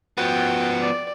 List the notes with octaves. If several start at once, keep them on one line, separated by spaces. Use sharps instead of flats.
F3 B3 F#4 G5
D5